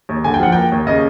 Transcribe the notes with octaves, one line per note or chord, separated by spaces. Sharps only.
D#2
D3 G#5
G5
F3 F#5
A#3 G5
D#2
C#3 D#5